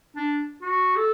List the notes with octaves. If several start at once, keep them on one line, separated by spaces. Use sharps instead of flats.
D4
F#4
A4